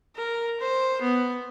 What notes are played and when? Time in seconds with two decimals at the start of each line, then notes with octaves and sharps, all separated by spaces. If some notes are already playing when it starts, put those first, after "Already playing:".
0.16 A#4
0.60 C5
1.01 B3